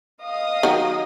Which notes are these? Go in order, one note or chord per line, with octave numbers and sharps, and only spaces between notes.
D#5 F5 D#6
D#3 F#3